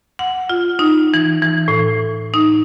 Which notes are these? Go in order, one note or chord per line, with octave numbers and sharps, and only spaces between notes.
F#5
F4
D#4
E3
E3
A2
D#4